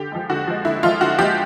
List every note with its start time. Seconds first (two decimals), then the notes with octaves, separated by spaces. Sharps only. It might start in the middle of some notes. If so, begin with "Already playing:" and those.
Already playing: D3 G4
0.12 F3 G#3
0.30 D3 F#4
0.47 F3 G#3
0.65 D3 E4
0.83 F3 G#3 F4
1.01 D3 F#4
1.19 F3 G#3 G4